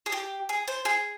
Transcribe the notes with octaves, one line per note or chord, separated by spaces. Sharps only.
G#4
G4
G#4
C5
G#4